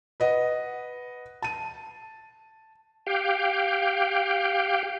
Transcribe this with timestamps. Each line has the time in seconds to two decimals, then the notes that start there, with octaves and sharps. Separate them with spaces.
0.20 B4 D#5 F#5
1.42 A5 D#7
3.07 G4 F5 G5